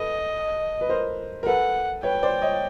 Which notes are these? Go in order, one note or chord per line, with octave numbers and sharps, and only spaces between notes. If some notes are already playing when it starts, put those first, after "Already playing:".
Already playing: A4 B4 D#5
B4
A#4 C5
A#4
A4 B4 F#5
B4 C#5 G5
C5 D5
C#5 D#5